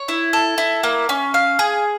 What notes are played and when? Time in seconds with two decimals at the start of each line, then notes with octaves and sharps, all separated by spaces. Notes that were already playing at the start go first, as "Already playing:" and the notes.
Already playing: C#5
0.08 E4
0.33 A4
0.58 E4
0.83 A#3
1.09 C#4
1.34 F5
1.59 G#4